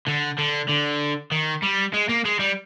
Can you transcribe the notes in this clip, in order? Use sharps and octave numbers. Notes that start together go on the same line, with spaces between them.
D3
D3
D3
D#3
G3
G#3
A#3
G#3
G3